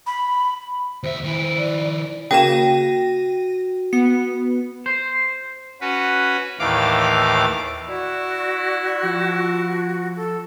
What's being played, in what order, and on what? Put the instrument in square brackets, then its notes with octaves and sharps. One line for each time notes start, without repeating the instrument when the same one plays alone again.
[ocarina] B5
[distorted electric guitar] D#2 E5 [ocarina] C5
[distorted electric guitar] D#3 E4
[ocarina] D5
[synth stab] C#3 A#3 E7 [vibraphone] F#4 [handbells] G5 [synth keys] A#6 D#7
[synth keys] B3 [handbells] C#7
[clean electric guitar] C5
[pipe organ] C#4 F#4 B4
D#2 A2 E3 F5 D6
[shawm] E4 [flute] F#4 [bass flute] D5
[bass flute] F3
[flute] A4